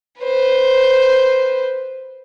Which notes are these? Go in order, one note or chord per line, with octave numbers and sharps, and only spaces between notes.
B4 C5